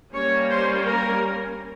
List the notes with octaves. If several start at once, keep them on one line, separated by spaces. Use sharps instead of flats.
G3 A#3 C#4 C#5
C5
A#4